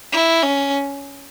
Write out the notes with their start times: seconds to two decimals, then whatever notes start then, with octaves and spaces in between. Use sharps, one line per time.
0.12 E4
0.42 C#4